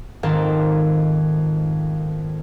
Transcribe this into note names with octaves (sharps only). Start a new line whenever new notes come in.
F2 G#2 D#3 A#3 A4 C6